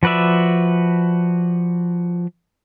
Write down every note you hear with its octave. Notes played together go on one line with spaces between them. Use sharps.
F3 F#4 B4 D5 E5